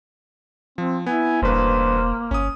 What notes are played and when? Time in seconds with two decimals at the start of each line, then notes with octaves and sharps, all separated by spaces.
0.78 F3 C4
1.06 B3 E4 G#5
1.42 E1 A1 G2 A#3 B4 C5
2.31 G1 C#4 D#6